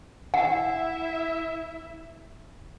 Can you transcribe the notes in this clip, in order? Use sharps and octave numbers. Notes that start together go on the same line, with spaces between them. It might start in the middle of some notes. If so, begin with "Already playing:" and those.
E4 E5 F#5